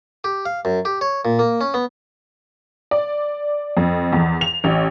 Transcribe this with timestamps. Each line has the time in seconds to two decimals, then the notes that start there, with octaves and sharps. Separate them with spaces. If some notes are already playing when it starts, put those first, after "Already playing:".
0.24 G4
0.46 F5
0.65 F#2
0.85 G4
1.01 C#5
1.25 A#2
1.39 A#3
1.61 C#4
1.74 B3
2.91 D5
3.77 F2
4.13 E2
4.41 F7
4.64 A1